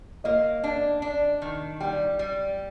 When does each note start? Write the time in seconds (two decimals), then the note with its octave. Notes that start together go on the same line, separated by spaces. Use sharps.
0.24 A#3 D#5
0.64 D4
1.02 D4
1.42 D#3
1.80 G3 G5
2.19 G3